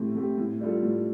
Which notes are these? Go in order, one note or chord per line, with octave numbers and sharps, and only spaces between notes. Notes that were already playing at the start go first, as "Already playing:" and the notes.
Already playing: A2 A3 C4 G4
A3 C4 G4
A2
G3 D4 F4 A4
A2